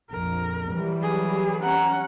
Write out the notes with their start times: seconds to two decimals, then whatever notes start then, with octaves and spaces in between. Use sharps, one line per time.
0.11 A#1 F2 A#4
0.70 E3 F#3 G3
1.02 G#4
1.63 C#4 F#5 A#5